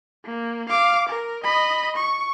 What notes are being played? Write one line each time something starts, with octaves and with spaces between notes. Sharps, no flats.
A#3
F5 D6
A#4
D#5 B5
C#6